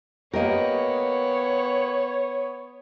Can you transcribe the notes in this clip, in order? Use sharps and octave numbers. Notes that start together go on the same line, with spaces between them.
A#3 B3 G4 A#4 C#5 D#5